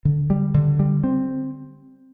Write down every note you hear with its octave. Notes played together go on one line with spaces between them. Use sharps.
D3
G3
D3
G3
C4